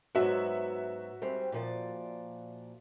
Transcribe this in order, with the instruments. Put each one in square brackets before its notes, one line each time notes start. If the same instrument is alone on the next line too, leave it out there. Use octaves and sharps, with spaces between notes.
[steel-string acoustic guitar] G#2 F#3 B3 [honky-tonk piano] F#4 E5
[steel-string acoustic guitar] G#2 G3 C4
A#2 F3 D5